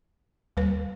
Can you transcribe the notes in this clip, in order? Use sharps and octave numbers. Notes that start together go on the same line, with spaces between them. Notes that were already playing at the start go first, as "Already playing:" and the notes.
D#2 G3 B4